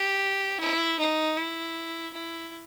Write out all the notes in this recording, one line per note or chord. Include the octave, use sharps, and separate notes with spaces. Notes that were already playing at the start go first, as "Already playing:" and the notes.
Already playing: G4
E4
D#4
E4
E4